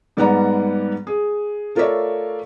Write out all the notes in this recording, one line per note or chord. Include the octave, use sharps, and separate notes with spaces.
G#2 G3 B3 D5 F#5 A#5
G#4
A3 F4 A#4 C#5 D5 E5